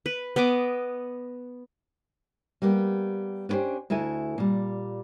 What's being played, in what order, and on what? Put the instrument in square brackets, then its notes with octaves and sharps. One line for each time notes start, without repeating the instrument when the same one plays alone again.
[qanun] B4
B3 B4 D#5 D6
[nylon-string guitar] G3 A#3 B3 G4
B3 C#4 D4 G4 C5
D2 E4 A4 D#5 G#5
A#2 G3